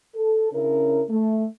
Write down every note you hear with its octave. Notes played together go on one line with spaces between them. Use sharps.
A4
C#3 C#4 D4 E4 A#4
A3